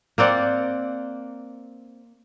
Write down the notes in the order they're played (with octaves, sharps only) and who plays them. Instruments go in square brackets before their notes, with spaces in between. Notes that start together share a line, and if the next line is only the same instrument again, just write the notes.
[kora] A#3 C4 D5 F#5